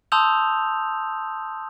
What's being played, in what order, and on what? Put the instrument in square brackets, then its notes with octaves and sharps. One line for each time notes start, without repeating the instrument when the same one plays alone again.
[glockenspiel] A5 C6 D#6 E6 G6 F7